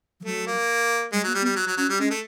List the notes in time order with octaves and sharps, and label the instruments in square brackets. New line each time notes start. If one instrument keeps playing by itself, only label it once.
[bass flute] F3
[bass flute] F#3 [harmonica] A3
[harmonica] A#3
[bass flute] G3 [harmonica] G#3
[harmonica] F#3 [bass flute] A#3
[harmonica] G3
[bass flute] B3
[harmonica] G3
F#3
F#3
[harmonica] F#3 [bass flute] C#4
[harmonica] G3
[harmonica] G#3 [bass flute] C#4
[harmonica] A3